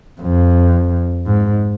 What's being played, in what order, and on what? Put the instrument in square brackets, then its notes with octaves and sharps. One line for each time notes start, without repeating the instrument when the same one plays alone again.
[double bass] F2
G#2